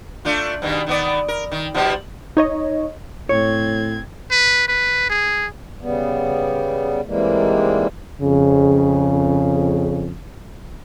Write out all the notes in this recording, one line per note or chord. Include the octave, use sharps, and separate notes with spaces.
A3 D4 F4
G2 B2 D#3
D#3 B3 D5
A#4
D#3
B2 F3 G3
D#4 C#5 D#5
A2 C4 C#5 G#6
B4
B4
G#4
C#3 G3 B3
G#2 C3 E3 G3 G#3 A#3
F2 C#3